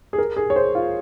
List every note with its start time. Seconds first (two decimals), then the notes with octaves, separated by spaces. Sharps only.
0.13 G#4
0.18 A#4
0.37 G#4
0.50 C#5
0.56 C5
0.75 F4